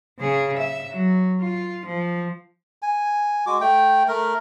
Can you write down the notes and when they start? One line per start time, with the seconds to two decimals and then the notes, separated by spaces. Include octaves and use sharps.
0.19 C#3 G#4
0.58 E5
0.91 F#3
1.41 F4
1.86 F3
2.82 G#5
3.46 G#3 F#4 D6
3.61 A3 G5
4.08 A3 A#4